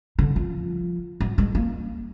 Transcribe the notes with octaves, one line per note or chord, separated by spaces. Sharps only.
D3
F3
F#3
G#3
A#3